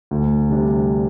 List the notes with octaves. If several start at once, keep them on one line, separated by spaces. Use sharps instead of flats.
D2
C3 G3 D4